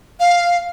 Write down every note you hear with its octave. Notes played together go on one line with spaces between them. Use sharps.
F5